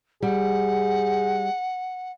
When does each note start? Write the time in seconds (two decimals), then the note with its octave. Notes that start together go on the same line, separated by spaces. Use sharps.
0.23 G3 G#4 F#5